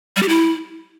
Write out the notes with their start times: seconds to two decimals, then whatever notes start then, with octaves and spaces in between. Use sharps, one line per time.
0.16 G3
0.23 G4
0.29 E4